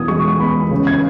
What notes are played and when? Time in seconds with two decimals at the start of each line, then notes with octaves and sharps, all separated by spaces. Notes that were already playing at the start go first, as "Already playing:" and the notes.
Already playing: E2 B2 D#6 G#6
0.08 G#3 C#6
0.40 B3 B5
0.71 C#3
0.87 G#6